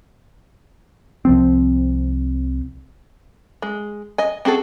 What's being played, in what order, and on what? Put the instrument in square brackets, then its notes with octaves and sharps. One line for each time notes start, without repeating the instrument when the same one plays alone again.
[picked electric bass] C2 F3 C4
[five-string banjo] G#3
D#5 G#5
C4 F#4 G#4 A4